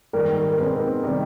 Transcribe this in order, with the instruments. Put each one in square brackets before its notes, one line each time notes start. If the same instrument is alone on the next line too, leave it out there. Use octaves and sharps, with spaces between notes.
[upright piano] G#2 D#3 G3 A#3 [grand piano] A#4
[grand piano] A#4
[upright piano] B2 G#3 C4 D#4 [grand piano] B4
[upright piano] C3 D#3 G3 C4 D#4